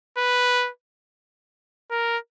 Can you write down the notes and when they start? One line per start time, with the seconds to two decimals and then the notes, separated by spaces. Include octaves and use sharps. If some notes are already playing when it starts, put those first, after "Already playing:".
0.18 B4
1.91 A#4